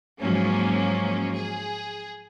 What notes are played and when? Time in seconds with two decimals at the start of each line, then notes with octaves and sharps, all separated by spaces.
0.19 G#2 F3 F#3 A#3 C#4
1.33 G#4